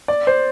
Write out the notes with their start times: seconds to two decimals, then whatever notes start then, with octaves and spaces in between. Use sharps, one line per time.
0.08 D5
0.27 C5